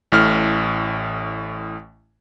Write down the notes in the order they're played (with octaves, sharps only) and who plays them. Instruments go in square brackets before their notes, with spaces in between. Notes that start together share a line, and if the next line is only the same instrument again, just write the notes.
[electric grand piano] A1 A2 F6